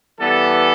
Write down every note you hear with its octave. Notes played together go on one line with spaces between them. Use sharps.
E3 G3 B3 A4